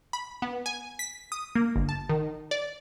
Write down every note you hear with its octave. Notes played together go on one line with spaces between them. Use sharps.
B5
B3
G#5
B6
D#6
A#3
G1
A5
D#3
D5